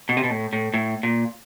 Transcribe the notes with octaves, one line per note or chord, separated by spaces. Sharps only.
B2
C3
B2
A2
A2
A2
A#2